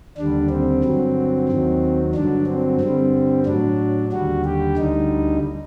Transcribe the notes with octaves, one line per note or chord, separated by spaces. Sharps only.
D#2 D3 G3 D4
C4
G2 D3 F#3
D#2 D#3 F#3
G2 D3 F#3 D4
C4
G2 D3 G3 C4
A2 F#3 D4
D#2 D3 G3 F#4
G4
D2 D3 G3 D#4